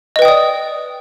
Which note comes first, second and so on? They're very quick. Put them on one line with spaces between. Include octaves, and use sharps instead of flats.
D#5 B4 G5 D#6 D5